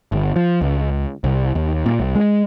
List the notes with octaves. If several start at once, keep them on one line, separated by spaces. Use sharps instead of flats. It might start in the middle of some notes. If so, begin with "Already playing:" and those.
G1
F3
C#2
C2
D#2
A#2
C2
G#3